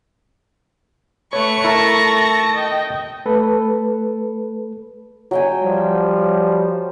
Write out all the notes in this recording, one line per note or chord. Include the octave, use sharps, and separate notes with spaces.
A3 B4 C#5 C#6
E4 A4 A#4 A5 A#6
D#5 G5
A3 A4 B4
F#3 G5 G#5
F3 G3